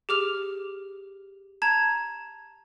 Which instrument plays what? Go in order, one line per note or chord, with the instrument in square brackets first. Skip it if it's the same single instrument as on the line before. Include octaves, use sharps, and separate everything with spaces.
[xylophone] G4 G#4 D6 F6 F7
A5 A#5 G#6